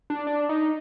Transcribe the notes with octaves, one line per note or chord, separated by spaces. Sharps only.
D4
D4
D#4